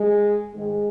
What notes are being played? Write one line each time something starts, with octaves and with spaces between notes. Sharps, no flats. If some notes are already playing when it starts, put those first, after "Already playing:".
Already playing: G#3
G#2 D#3 G#3